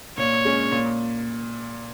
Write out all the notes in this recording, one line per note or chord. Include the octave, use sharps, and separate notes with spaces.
A#2 C#5
G#3 C#4
A#2